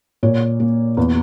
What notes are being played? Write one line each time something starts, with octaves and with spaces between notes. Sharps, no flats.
A#2 C#5
A#3
E2